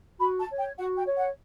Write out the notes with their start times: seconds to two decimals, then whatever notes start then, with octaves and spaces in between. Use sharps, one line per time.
0.20 F#4 B5
0.39 A5
0.49 C#5
0.59 G5
0.78 F#4 F#5
0.97 G5
1.07 C#5
1.17 F#5